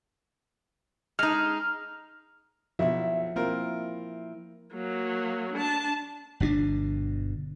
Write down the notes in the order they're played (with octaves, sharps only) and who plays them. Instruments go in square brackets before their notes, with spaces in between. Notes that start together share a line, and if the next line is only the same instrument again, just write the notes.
[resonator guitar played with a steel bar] G#3 D#4 [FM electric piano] F6
[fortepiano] B1 E4 [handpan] F3 E5
[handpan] A#3 E4 [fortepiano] C4 F4 A#4
[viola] F#3 A#3
D4 A5
[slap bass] G1 B2 C#4 D4